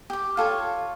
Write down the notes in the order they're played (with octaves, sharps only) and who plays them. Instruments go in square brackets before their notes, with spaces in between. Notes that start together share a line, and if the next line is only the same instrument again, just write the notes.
[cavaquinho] G4 D6
F4 A4 C#5